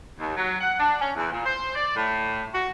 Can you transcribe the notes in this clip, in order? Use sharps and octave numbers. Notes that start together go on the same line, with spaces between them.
D#2
F#3
F#5
D4
C#4
E2
A#2
C5
D5
A2
F#4